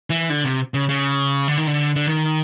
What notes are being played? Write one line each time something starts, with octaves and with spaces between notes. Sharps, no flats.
E3
D3
C3
C#3
C#3
D3
D#3
D3
D3
D#3